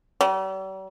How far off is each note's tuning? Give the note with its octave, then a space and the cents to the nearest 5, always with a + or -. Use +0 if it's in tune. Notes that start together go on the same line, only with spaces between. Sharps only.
G3 -45